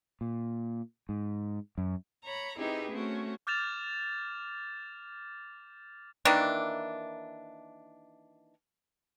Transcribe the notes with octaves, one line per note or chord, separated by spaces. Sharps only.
A#2
G#2
F#2
C#5 A#5 B5
C4 D#4 E4 G4 G#4 B4
A3 C4 C#4 F#4
D6 F6 G6 A6 E7 F7
D#3 E3 A#3 D4